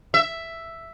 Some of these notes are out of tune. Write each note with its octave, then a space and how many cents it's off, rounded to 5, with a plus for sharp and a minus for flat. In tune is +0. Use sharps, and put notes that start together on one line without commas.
E5 +5